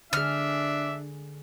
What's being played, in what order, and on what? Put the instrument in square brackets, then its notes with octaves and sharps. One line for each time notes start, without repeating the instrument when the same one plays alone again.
[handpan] D3 G#4 [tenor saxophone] D4 [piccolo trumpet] E5 [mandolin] F6